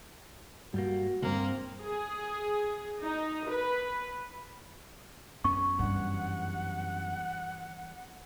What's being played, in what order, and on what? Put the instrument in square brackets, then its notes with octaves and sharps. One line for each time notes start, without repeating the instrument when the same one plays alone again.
[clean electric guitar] G2 G3 A#3 [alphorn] F#4
[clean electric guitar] C#2 G2 [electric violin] A#3 [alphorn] C4
[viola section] G#4
D#4
B4
[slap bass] F#2 B3 C#4 [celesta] C#6
[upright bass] G2 E3 [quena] F#5